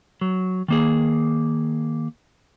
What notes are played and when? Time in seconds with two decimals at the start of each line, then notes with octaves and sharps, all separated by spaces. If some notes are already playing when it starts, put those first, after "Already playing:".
0.21 F#3
0.68 D#3 A#3 G#4